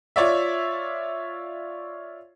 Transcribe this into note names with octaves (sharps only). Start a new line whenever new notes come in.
F4 C#5 D5 E5